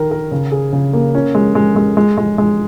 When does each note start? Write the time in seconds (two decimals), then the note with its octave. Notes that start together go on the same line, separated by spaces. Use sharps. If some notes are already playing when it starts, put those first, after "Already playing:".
Already playing: D#3 A#4
0.11 A#4
0.32 C#3
0.52 G#4
0.73 C#3
0.93 A#3
1.15 C#4
1.35 G#3
1.55 G#3
1.76 G#3
1.97 G#3
2.17 G#3
2.38 G#3